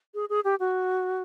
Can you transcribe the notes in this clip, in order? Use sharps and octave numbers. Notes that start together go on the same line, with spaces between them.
G#4
G#4
G4
F#4